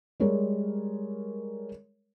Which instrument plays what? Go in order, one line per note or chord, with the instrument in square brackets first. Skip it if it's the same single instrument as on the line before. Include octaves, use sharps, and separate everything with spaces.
[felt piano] G3 G#3 A#4 C#5